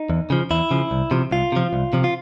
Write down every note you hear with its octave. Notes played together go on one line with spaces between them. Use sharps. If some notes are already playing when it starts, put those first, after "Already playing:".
Already playing: D#4
E2
C#3 F3
E2 E4
C#3 F3
C2
C3 F3
C2 F4
C3 F3
C2
C3 F3
F4